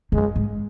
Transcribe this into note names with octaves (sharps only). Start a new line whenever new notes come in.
F#2 G#3
G#2